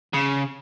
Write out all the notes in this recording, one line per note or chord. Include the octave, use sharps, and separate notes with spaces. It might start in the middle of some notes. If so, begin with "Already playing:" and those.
C#3